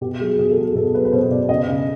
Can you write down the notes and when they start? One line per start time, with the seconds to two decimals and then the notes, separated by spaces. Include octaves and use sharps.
0.01 B2 G4
0.20 F#3 G#4
0.39 B2 G#4
0.51 A4
0.57 F#3 G#4
0.75 B2 A4
0.94 F#3 B4
1.05 B4
1.12 B2 C5
1.30 B2 D5
1.49 C#3 D#5
1.68 C#3